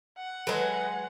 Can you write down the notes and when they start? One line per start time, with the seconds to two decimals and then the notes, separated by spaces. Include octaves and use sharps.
0.18 F#5
0.47 F#3 G#3 A4 B4 D#5